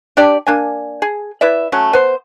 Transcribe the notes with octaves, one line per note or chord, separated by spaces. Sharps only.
D4 G4 D5
A#3 D4 G#5
G#4
E4 B4 D5 E5
F#3 A3 C#4
B3 C5